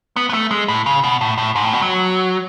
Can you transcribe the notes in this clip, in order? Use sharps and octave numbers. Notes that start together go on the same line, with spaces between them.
B3
B3
A3
G#3
A2
C#3
B2
A2
A2
G#2
A2
B2
F#3